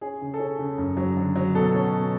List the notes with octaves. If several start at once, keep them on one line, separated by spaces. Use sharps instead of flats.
C#4 G#4
C#3
A4
C#4 G#4
C#3
F#2
F#3
D3
F#3
B2 A4
C#4
B2